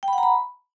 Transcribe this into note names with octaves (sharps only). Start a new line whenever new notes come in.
G5
B5
F#5
A#5
B5